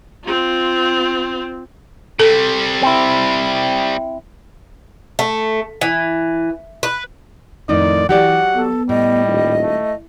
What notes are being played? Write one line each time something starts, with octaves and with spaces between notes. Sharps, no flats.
C4 F4
C3 G3 A4
C4 E4
A3
E3
B4
F2 A2 D#3 D#4 D5
E3 F#3 G4 D5 F#5
B3 A4
A2 G3 D#5
D#1
A3